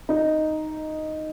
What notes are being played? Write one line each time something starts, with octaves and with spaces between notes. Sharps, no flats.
D#4